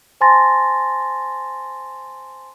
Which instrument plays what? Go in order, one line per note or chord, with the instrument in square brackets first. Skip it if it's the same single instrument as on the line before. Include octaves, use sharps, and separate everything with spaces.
[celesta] C5 G#5 A5 C6 A6 A#6